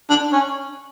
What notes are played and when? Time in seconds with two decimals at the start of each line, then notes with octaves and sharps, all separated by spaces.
0.10 D4
0.32 C#4